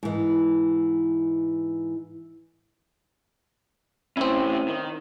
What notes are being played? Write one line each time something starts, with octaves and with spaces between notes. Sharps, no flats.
G#2 E3
A2 C4 C#4 E4
D#3